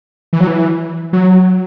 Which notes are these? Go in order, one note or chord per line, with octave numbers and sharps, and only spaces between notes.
E3
F#3
E3
F#3